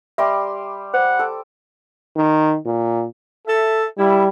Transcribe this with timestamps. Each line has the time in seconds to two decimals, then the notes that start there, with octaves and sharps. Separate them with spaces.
0.18 G3 E5 C6 D6
0.94 C5 F#5
1.19 A4 D6
2.17 D#3
2.66 A#2
3.47 A4 E5
3.99 G3 E4